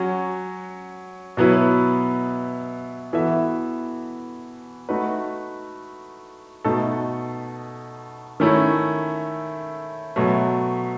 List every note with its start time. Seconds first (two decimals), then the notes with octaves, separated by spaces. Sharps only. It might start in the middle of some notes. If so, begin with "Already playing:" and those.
Already playing: F#3 C#4 F#4
1.37 B2 F#3 B3 E4 B4
3.13 E3 B3 F#4 A4 E5
4.89 A3 D#4 F#4 B4
6.64 B2 A3 D#4 A4
8.40 D#3 A3 C#4 E4
10.16 B2 F#3 A3